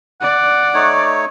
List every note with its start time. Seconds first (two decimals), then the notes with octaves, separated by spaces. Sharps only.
0.21 D5 F#5
0.74 A3 D#4 C#5